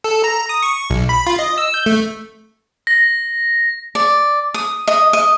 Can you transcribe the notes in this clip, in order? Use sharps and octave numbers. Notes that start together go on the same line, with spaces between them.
A4
A#5
D#6
C#6
B1
B5
F4
D#5
E6
G6
A3
A#6
D5
D#6
D#5
D#5